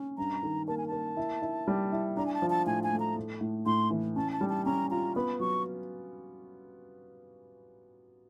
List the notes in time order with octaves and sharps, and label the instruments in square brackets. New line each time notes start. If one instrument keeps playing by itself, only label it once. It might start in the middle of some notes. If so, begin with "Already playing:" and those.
Already playing: [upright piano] C#4
[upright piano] G2 [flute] A#5
[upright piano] D#3
[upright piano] A#3 [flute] A5
[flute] G#5
[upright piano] A#3 [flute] A5
[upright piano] E4
E4
G3
E4
[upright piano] D4 [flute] A#5
[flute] G#5
A5
[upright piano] F3
[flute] A5
[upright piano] A2 [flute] G#5
[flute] G#5
[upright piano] A3
[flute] A#5
[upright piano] A2
A2
[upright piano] A2 [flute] C6
[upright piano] E3
[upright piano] C#4 [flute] A5
[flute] A5
[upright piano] G3
[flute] A5
[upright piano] C#4 [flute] A#5
[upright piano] F4 [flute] A#5
[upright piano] B3 [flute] B5
[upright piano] F#3 [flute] C#6